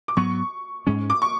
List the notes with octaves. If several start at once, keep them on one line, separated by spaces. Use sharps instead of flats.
D6
G#2 F#3 B3 C#6
G#2 G#3 C#4
D6
C#6